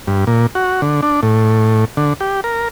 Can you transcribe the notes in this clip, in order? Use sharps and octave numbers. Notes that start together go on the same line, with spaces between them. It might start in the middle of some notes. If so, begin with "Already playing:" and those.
G2
A#2
F#4
D3
D4
A2
D3
G4
A#4